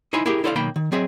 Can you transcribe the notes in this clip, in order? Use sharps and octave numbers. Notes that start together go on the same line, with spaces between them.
D#4 E4 C5 E5 G#5 B5
E4 G4 G#4 A#4 G5
E4 A4 C5 D5 E5 F5
B1 D#3 A#3 G5 B5
D#3
F#3 C4 G#4 D#5 E5